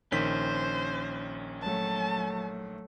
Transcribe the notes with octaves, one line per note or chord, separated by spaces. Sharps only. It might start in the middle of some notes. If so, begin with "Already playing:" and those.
A#1 D#3 C#4 C5 B6
F#3 A3 A5